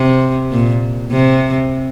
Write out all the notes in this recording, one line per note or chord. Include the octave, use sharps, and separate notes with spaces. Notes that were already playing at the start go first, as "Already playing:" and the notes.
Already playing: C3
A#2
C3